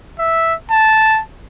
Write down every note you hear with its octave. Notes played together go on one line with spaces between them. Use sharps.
E5
A5